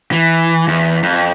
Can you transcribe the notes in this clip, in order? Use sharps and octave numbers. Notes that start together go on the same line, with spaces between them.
E3
E2
F2